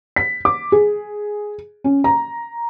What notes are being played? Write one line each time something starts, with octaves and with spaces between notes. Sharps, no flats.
B6
D6
G#4
C#4
A#5